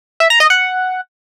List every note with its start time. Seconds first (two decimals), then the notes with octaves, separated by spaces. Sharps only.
0.20 E5
0.30 A#5
0.40 D#5
0.50 F#5